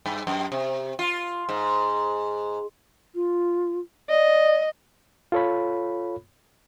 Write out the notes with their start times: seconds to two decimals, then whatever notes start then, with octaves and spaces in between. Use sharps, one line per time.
0.06 G2
0.27 F#2
0.52 C3
0.99 F4
1.49 G#2
3.15 F4
4.09 D5 D#5
5.32 F4 A4 C#5 B5